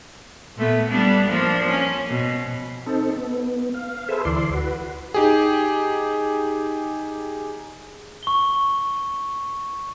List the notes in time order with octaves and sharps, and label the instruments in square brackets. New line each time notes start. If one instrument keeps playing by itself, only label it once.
[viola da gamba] A#2 A3 B3
G3 B3 D4
F3 A#3 D4
C#4
B2
[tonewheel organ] C4 D#4 A4
B3
F5
G#4 A4 B4 C5 E5
D2 E3 D5 C6
F#4 B4
[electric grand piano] D#4 G4 G#4
[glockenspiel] C#6 G7